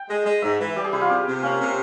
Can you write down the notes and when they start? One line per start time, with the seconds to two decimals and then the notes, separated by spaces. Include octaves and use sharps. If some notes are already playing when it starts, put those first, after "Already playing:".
Already playing: G5
0.09 G#3
0.25 G#3
0.42 G#2 E5
0.60 E3
0.76 G3 G4
0.84 G#4
0.92 C3 E4
1.02 F4
1.09 C3 G4
1.27 C3
1.43 A#3 C#4
1.60 C3